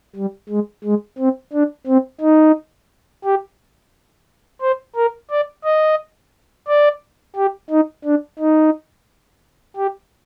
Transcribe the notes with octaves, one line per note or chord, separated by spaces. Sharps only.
G3
G#3
G#3
C4
D4
C4
D#4
G4
C5
A#4
D5
D#5
D5
G4
D#4
D4
D#4
G4